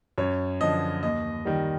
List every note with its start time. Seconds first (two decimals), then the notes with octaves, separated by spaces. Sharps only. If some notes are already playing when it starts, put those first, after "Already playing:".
0.18 F#2 C#5
0.61 D3 F3 D#5
1.03 D#2 D#5
1.45 D#3 G3